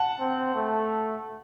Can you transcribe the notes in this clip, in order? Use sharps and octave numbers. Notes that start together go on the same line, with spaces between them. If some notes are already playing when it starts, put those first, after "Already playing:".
Already playing: F#5 A5
C4
A3